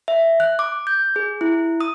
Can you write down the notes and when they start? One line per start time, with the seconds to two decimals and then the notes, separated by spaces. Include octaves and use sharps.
0.08 E5
0.40 F#6
0.59 D6
0.87 G6
1.16 G#4
1.41 E4
1.81 D#6